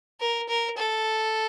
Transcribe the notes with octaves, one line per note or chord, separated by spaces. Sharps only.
A#4
A#4
A4